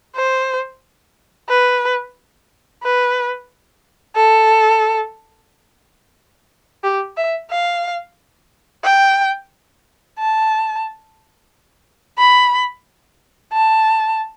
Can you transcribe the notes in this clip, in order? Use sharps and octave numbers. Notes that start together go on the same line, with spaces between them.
C5
B4
B4
A4
G4
E5
F5
G5
A5
B5
A5